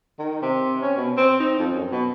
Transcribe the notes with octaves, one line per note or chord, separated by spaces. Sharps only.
D#3
C3
C#4
B2
C4
D#4
F2
F#2
B2